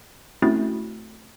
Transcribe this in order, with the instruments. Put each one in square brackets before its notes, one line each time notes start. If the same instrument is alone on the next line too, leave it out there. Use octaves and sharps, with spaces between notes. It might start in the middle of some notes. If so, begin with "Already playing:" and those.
[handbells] A3 C4 C#4 E4 F#4 A6